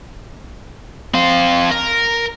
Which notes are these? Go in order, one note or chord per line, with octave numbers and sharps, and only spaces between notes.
C4 F5
A#4